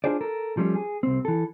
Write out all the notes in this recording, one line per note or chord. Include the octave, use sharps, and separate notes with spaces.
D4 F4 G#4 C5 D5
A4 A#4
F3 G3 A3 C#4
G#4
C2 C4
E3 A4